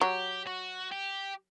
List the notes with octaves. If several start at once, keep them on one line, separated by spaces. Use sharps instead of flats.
F#3 G4
F#4
G4